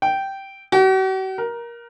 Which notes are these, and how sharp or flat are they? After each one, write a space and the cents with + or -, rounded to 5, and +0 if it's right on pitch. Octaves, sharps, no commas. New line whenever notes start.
G5 -10
F#4 +45
A#4 +15